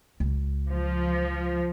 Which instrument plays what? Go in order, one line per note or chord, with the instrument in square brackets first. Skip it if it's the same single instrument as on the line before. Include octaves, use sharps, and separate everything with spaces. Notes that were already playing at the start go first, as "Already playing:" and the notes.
[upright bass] C#2
[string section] F3